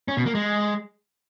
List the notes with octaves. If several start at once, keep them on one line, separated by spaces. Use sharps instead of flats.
C#4
B2
A#3
G#3